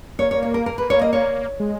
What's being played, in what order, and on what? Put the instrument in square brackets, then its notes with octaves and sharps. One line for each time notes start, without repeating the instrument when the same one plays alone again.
[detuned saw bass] A#3 [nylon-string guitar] C#5
[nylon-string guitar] C#5
C#5
A#4
A#4
B4
C#5
D#5
C#5
[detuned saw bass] G#3